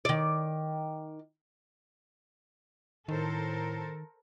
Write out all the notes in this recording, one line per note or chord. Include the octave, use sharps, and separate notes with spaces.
D#3 D5
A2 D#3 A4 A#4 C5